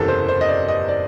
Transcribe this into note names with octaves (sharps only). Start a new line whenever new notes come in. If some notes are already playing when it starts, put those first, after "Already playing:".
Already playing: F#1 E2 C3 A4
C5
C5
D#5
D5
D#5
D5